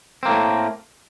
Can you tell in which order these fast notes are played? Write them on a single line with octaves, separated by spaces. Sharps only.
C4 A#3 A2 A3